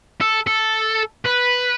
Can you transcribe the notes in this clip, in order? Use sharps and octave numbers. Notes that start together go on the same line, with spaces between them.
A4
A4
B4